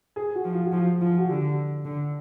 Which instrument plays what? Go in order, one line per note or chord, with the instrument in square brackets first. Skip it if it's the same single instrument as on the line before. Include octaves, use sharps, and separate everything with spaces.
[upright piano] G#4
F#4
[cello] F3
[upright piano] F4
F#4
[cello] F3 [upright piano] F4
[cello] F3 [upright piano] F4
[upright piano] F#4
[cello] D3 [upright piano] G4
[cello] D3